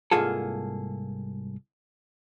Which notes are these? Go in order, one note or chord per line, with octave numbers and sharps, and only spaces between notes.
C2 G#2 A#3 F4 G#4 A4